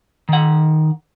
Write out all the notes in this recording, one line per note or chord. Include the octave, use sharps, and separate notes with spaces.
D#3 F#5